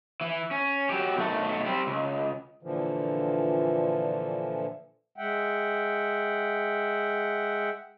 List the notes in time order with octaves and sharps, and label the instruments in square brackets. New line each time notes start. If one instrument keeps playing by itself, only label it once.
[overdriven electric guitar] E3
C#4
F#3 G4
B1 A3
G3 C4
C#2
[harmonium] A#2 D3 E3 F3
G#3 E5 F#5 G5